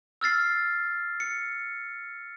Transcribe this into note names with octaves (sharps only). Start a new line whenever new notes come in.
E6 F6 A6 C7
C#7